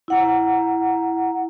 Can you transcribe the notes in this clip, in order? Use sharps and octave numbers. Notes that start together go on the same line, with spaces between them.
E4 F#5 A#5